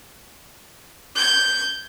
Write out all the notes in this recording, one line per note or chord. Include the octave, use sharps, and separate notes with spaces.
G6 G#6